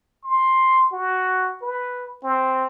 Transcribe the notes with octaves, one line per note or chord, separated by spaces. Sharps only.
C6
F#4
B4
C4